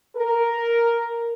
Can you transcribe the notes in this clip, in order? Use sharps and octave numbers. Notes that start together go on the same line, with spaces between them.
A#4